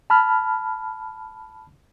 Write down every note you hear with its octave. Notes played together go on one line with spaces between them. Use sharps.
A5 B5 F6